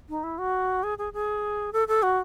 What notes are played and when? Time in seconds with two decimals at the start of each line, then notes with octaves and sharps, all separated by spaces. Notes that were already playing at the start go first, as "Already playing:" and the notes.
0.09 D#4
0.24 E4
0.38 F#4
0.83 G#4
0.98 G#4
1.13 G#4
1.73 A4
1.88 A4
2.03 F#4